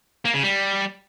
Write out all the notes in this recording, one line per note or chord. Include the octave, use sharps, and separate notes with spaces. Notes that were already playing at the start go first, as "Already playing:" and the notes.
A#3
C#3
G3